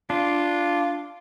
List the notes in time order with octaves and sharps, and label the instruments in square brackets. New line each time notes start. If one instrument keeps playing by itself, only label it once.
[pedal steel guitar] D4 [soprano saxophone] F4